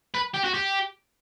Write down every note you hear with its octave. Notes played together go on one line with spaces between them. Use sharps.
B4
G4
F#4
G4